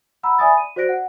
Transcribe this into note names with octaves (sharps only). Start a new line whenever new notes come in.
F#5 A#5 B5 E6
D5 E5 G#5 B5 D#6 A6
D#7
F#4 C5 D5 F#6 A#6 D7
F#5